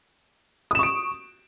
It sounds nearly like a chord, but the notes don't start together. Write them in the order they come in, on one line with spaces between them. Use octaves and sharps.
D#6 E7 C#6 D7